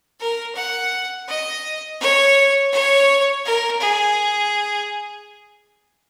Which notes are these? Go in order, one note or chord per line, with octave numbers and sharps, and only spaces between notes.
A#4
F#5
D#5
C#5
C#5
A#4
G#4